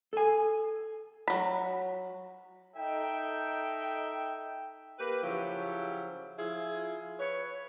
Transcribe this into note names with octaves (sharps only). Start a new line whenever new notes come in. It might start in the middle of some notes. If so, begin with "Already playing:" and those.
A4 G#5
F#3 B5
D#4 A4 E5 G5
A#3 G4 B4
C#3 F3 F#3 E4 G4
F3 E4 F4 G#4
B4 C#5